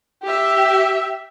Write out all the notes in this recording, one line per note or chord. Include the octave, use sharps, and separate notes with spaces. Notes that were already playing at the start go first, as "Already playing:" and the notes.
G4 E5